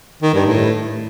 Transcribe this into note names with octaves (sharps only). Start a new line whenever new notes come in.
D#3
G2
A2